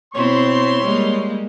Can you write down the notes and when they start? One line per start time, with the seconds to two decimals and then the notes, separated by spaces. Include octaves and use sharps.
0.14 B2 C4 E4 C#5 C6
0.81 G3 G#3 A#3